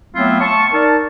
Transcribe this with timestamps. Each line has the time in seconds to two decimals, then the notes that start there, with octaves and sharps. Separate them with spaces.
0.15 F#3 A3 B3 C4 E4 F4
0.41 A5 C#6
0.73 D#4 A#4 D5 A5